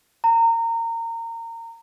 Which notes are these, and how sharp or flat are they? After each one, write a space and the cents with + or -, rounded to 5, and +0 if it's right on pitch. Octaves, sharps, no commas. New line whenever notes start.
A#5 -25